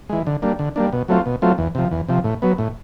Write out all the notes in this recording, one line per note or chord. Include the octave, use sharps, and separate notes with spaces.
E3 G#3
D3
G3 A#3 D4
D3
G3 A#3 D4
B2
F#3 A3 C4 F4
B2
F#3 A3 C4 F4
E2
C3 F3
E2
C3 F3
A2
F#3 B3
A2